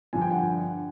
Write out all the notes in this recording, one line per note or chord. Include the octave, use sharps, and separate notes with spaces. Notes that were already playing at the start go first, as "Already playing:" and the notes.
G2 D3 F3 G#5
G5
F#5 G#5